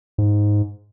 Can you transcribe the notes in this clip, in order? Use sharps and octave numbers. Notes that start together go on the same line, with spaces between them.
G#2